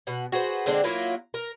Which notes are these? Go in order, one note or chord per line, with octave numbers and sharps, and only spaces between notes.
B2 F#5
F#4 G#4 B4 C5
D3 G#3 C4 D4
F#3 A#3 E4 F4
A#4